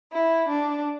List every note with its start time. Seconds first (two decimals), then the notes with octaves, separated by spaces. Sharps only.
0.13 E4
0.49 D4